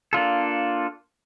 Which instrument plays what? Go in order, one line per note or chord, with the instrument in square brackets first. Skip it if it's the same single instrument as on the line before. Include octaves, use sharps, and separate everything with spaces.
[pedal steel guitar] A#3 D4 F4 A4